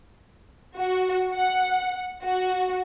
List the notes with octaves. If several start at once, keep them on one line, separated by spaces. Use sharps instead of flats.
F#4
F#5
F#4